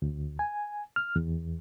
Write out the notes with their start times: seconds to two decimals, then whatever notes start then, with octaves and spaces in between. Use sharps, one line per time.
0.02 D2
0.39 G#5
0.96 F6
1.16 E2